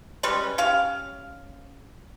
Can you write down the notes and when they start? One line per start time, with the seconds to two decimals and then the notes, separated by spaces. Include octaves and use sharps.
0.23 G3 G#3 C#4 B4
0.58 C#4 G4 F5